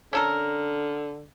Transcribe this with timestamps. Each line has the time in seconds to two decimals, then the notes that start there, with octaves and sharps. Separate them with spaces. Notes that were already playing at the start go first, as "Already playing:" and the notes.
0.13 D3 C#4 A4 A#4